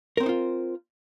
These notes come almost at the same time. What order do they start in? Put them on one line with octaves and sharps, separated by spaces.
A#4 C4 C5 D#4 F4